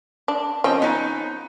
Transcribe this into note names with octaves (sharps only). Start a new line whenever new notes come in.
D4
F3 C4 C#4 D#5 G5
B3 D#4